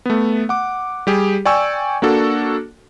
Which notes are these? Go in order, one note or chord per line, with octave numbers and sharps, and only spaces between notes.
A3 B3
F#5 D6
G3 G4 G#4
D5 G5 G#5 C#6 E6
A#3 D4 F#4 A4